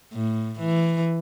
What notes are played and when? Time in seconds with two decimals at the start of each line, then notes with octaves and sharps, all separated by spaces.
0.13 A2
0.59 E3